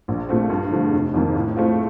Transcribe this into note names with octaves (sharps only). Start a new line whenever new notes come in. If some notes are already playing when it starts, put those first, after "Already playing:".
A#1
A#2 A3 C4
G2
D3 F3 A3
F1
F2 D#3 A#3
A2
A3 C4 F4